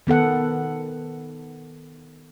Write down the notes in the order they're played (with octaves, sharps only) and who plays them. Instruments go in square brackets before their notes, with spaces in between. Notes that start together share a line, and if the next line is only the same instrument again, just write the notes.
[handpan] D#3 B3 A4 F#5